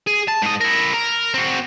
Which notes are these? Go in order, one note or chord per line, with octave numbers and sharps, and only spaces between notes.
G#4
A5
G#2 D#5
E4 A#4
A#4
C4 F#4